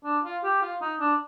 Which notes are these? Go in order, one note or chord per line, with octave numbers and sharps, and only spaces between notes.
D4
F4
G4
F4
D#4
D4